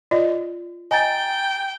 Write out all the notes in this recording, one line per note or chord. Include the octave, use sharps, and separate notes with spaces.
F4 D5 D#5
D#5 G5 G#5 A#5 A6